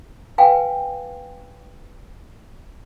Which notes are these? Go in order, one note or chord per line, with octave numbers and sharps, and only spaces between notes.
B4 F5 G5 G#5